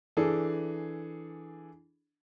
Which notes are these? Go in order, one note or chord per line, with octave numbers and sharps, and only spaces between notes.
E3 D4 G#4 A4